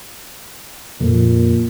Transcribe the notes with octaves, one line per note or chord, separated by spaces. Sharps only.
F2 A#2